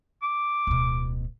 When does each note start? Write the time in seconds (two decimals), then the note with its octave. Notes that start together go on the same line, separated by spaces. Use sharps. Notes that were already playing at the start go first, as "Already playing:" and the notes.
0.22 D6
0.67 D1 B2